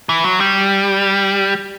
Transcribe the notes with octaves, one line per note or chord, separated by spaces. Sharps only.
E3
F#3
G3